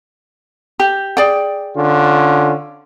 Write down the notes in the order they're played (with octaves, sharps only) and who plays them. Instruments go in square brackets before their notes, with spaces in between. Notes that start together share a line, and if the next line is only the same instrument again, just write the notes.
[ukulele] G4
G#4 D5 G5
[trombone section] D3 C#4 F4